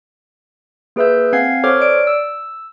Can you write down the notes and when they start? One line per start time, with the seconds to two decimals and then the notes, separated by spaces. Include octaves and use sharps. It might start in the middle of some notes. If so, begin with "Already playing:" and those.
0.96 A#3 G#4 B4 E5 E6 G6
1.33 C4 F5 F#5 G#5 G#6 C7
1.64 A4 C5 C#5 D6 F6 G#6
1.81 D5 D7
2.07 E6